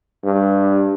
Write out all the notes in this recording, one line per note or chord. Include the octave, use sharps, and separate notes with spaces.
G2